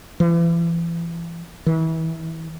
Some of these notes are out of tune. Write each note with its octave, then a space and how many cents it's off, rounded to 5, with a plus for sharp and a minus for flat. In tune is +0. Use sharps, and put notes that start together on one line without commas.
E3 +35
E3 -30